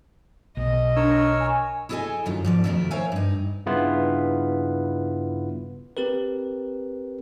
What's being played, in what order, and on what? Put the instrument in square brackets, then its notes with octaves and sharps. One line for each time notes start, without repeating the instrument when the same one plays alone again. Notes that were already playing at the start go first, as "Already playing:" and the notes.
[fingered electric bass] B1 [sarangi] D#5
[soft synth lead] D4 [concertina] A#4 C#5 E6
[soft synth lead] G#5
[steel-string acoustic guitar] E4 G#4 A4 C#5 D#5 G#5
F#2 D#3 F4
G#2 F3 D5
F2 B2 D#3 G#3 A3 A#4
A#4 C5 C#5 E5 F5 G#5
G2 D#4
[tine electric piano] G2 C#3 B3 E4 F4 B4
C4 G4 A#4 B4